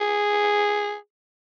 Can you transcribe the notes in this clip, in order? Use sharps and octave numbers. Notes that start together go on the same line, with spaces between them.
G#4